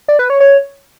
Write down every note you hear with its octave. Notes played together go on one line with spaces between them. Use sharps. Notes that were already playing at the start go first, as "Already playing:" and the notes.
D5
B4
C#5
C#5